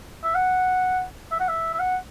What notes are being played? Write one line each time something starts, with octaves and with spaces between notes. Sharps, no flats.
E5
F#5
E5
F#5
E5
E5
F#5